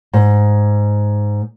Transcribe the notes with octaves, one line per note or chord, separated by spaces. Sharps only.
G#2